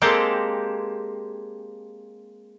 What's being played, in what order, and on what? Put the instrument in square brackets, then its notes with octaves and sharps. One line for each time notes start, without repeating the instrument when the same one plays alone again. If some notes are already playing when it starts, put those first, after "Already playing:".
[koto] G#3 A#3 C4 G4 A4